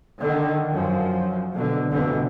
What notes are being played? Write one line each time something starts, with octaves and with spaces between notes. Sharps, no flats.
D3 D#3
F#2 F3
B2 D3
F1 C2 B2 D3 E3